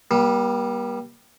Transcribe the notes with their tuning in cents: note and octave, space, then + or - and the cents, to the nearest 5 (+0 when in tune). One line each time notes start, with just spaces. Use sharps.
G3 +0 A#3 +45